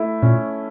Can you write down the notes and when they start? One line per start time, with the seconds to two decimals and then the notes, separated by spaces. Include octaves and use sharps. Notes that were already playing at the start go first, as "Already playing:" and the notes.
Already playing: A3 E4
0.22 A#2 C#4